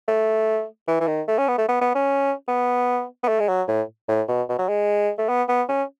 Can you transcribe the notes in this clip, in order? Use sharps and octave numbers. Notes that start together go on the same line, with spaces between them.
A3
E3
E3
D#3
A3
C#4
B3
A3
B3
B3
C#4
B3
B3
A3
G#3
F#3
A2
A2
B2
B2
F#3
G#3
A3
B3
B3
C#4